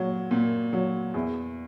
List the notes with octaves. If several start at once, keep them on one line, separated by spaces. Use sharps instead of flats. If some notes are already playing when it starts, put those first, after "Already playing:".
Already playing: A#2 F#3
A#2
F#3
E2